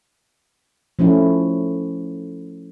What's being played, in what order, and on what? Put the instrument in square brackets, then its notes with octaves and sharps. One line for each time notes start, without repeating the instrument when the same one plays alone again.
[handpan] F3 A3 C#4 E4